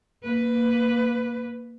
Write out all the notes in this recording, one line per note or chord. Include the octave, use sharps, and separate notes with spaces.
A#3 B4